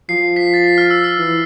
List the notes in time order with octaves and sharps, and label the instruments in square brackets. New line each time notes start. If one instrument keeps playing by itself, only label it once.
[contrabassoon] F3 [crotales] C7
[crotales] B6
A6
B6
F6
E6
E6
[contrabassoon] E3